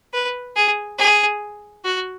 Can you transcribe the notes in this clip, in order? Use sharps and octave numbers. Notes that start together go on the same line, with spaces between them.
B4
G#4
G#4
F#4